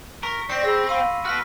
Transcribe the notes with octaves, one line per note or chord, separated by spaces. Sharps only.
A#4 C#6 B6
C4 D5 A#6 C7 C#7
G#4 B5 E6
F5 B5 C6 D#7
F#4 B4 F6 B6